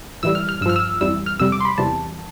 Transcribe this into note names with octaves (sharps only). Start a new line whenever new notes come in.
A2 E3 G3 E6
F6
F6
G2 F3 E6 F6
E6
F2 E3 G3 E6
F6
F2 C3 G3 E6
D6
C6
B5
E2 C3 E3 G3 A5